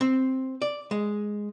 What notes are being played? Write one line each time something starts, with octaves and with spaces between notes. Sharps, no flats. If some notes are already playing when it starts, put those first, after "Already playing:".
C4
D5
G#3